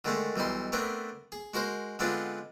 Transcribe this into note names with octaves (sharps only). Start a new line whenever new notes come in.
D3 D#3 G#3 A3 D#4
B1 E3 G3 D#4 C6
A3 B3 C4 D4 A#4
G#4
G#3 F#4 A#4 C5
D3 G#3 B3 C4 D4 F4